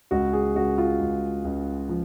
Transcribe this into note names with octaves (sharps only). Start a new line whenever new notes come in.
C#2 F#4
G#4
C#2 F#4
F4
C#2
C#2
F3